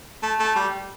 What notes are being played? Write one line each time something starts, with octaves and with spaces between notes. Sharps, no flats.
A3
A3
G3